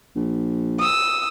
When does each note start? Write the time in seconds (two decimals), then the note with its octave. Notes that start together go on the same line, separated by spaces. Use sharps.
0.16 A#1
0.80 D#6 E6